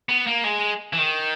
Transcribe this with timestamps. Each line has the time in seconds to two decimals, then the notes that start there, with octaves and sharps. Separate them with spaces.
0.09 B3
0.27 A#3
0.44 G#3
0.93 E3
0.98 D#3